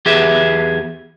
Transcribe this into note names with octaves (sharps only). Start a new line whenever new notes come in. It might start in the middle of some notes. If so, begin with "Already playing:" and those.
E2 G4 G#4 B4 E5